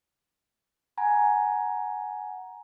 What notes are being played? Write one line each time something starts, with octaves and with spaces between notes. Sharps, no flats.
F#5 G#5 A#5